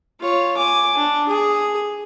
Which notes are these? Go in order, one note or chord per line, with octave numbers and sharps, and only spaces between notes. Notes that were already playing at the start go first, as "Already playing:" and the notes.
F4 C#5
G#5 D6
D4
G#4